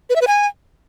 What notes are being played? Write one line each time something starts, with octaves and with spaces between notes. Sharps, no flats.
B4
E5
B4
G#5